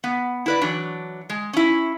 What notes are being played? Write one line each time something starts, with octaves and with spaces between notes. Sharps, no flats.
B3
E4 B4 D5
E3 F#3 D4
G#3
C#4 E4